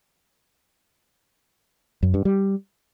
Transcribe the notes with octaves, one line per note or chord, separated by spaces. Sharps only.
F#2
G2
G3